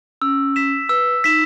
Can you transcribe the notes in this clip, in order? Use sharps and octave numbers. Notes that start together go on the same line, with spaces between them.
C#4 E6
B6 E7
B4 E6
D#4 B6 E7